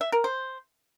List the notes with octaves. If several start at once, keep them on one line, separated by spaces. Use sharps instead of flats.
E5
A#4
C5